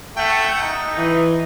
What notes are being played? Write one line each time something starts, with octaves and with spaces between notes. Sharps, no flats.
A3 F#5 G5
D#4
E3